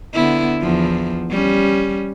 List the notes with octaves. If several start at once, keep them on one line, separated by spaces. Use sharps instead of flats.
D3 B3 E4
E2 F3
G3 C#4